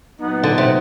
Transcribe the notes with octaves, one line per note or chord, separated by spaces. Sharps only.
A#2 F#3 B3 D#4
D3
C3